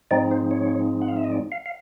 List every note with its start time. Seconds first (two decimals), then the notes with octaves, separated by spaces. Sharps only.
0.11 G#2 F3 G#3 C4 D#4 D5
0.31 C5
0.51 C#5
1.02 F#5
1.08 F5
1.17 E5
1.24 D#5
1.32 D5
1.52 F5
1.66 F5